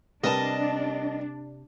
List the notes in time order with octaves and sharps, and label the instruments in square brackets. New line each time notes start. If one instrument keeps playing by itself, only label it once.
[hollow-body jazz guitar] C3 [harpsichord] G3 A#4 B4 [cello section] D4 [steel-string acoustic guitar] D#5 A5